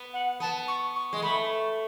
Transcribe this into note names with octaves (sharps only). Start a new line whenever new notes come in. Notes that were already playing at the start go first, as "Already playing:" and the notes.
Already playing: B3
F#5
B3 A5
C#6
C#6
G#3
A3 B5
C#6